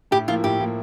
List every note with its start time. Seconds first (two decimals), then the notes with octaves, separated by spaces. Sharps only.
0.11 A2 G4
0.28 F3 A#3 E4 F4
0.44 A2 G4
0.60 F3 A#3 E4